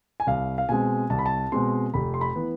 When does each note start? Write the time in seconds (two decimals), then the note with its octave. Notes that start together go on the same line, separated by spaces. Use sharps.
0.20 G#5
0.27 C2 F5
0.58 F5
0.69 B2 G#3 C4 G#5
1.10 C2 A5
1.19 B5
1.26 A5
1.52 B2 G#3 C4 C6
1.94 F1 B5
2.14 C6
2.21 B5
2.36 E3 B3